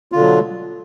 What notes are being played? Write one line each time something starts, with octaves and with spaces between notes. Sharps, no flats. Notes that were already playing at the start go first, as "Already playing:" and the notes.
B2 D3 F#3 F4